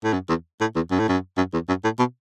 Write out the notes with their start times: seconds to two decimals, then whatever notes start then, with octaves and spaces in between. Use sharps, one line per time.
0.04 A2
0.13 F#2
0.29 E2
0.61 A2
0.75 E2
0.91 F#2
0.99 A2
1.09 F#2
1.37 F#2
1.53 E2
1.69 F#2
1.84 A2
1.99 B2